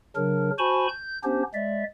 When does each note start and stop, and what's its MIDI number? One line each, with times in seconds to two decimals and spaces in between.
0.16 0.50 49
0.16 0.50 54
0.16 0.50 62
0.16 0.50 70
0.59 0.87 66
0.59 0.87 72
0.59 0.87 80
0.59 0.87 81
0.59 0.87 83
0.59 0.87 85
0.89 1.18 91
1.24 1.43 59
1.24 1.43 61
1.24 1.43 62
1.24 1.43 67
1.24 1.43 72
1.54 1.84 56
1.54 1.84 74
1.54 1.84 76